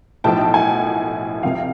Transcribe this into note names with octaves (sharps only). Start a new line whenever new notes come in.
B1 A2 F3 G5 A5
F#5 G#5
C2 C3 F3 F5 G5